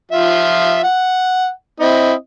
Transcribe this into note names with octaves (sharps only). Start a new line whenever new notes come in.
F3 F4 E5
F#5
C4 E4 D#5